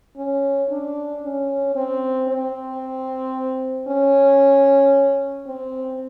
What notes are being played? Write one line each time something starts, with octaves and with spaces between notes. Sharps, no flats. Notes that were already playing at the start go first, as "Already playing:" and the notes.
C#4
D4
C#4
C4
C4
C#4
C4